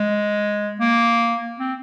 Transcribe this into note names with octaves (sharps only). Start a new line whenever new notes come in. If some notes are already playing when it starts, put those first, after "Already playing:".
Already playing: G#3
A#3
C4